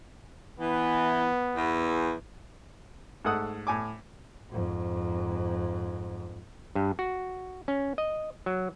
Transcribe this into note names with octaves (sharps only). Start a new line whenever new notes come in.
E3 B3
E2
G#2 A3 A4 F#5 D#6 F#6
A2 G#5 D6
F2 G#2
G2
F#4
C#4
D#5
F#3